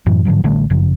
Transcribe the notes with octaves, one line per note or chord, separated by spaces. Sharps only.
F#2 A2 E3
G#2 D3 F3 F#3
A1 D3 G3 A3
G1 F#2 C#3 F3